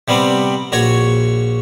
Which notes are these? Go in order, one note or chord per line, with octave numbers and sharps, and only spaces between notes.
C3 G3 B3 C4
A#1 F#4 C#5 C#6